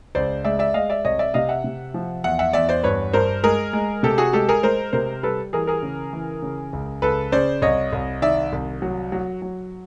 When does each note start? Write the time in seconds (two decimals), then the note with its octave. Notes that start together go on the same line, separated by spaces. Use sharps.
0.15 C#2 C5 D5
0.44 G#3 D5 E5
0.59 D5 E5
0.74 G#3 D#5 F5
0.90 D5 E5
1.05 C2 C#5 D#5
1.19 D5 E5
1.34 C3 D#5 F5
1.49 E5 F#5
1.64 C3
1.94 F3
2.24 E2 E5 F#5
2.39 E5 F#5
2.53 E2 D5 E5
2.69 C5 D5
2.84 G2 B4 C#5
3.13 G2 A#4 C5
3.43 G#3 G#4 A#4
3.73 G#3
4.03 C3 G4 A4
4.18 F#4 G#4
4.33 G#3 G4 A4
4.49 G#4 A#4
4.63 G#3 A#4 C5
4.93 C3 A#4 C5
5.23 G3 A4 B4
5.53 E3 G#4 A#4
5.67 G#4 A#4
5.83 C#3
6.13 E3
6.42 C#3
6.73 C#2
7.02 C#2 A4 B4
7.32 C#3 C5 D5
7.62 C2 C#5 D#5
7.93 C2
8.22 D#3 D5 E5
8.53 C2
8.82 F#3
9.12 F#3
9.42 F#3